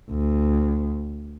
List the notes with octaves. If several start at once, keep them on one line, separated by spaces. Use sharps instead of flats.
D2